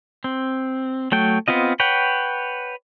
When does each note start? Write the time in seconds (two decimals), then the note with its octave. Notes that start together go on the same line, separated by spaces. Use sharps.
0.24 C4
1.12 F#3 A3 G5
1.48 B3 C4 F4 D#5
1.80 B4 C#5 F#5 G5